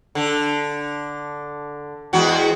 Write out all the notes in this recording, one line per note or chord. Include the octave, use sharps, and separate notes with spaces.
D3
E2 G#3 F#4